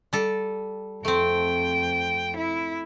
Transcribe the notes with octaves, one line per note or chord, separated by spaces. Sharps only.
G3 A4
F2 A3 C4 G5
E4